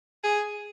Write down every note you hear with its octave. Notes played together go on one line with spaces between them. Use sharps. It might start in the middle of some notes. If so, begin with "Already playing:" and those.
G#4